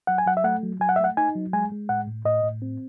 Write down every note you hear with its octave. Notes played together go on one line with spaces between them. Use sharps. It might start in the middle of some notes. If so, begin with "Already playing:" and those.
F#3 F#5
G#5
F#3 F#5
E5
A3 F#5
F#3
F#3 G#5
F#5
E5
A3 F#5
D#4 G#5
F#3
G#3 G#5
G#3
A2 F#5
A2
A2 D#5
A2
C4